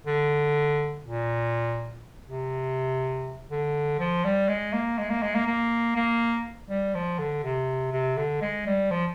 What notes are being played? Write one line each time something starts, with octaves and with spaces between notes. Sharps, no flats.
D3
A#2
C3
D3
F3
G3
G#3
A#3
G#3
A#3
G#3
A#3
A#3
A#3
G3
F3
D3
C3
C3
D3
G#3
G3
F3